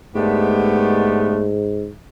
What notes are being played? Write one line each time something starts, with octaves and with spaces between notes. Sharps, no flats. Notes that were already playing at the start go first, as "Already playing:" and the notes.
G#2 D3 G#3 A3 B3 G4